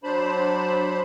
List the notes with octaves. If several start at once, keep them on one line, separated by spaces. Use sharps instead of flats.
F#3 D4 C5 A5 B5